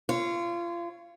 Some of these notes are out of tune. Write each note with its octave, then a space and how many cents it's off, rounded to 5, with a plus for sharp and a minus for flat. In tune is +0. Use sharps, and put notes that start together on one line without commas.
F4 -30 C#5 +0